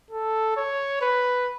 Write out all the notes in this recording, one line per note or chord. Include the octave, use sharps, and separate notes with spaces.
A4
C#5
B4